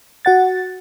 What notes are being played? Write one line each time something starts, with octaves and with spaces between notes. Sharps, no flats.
F#4 F#5 A6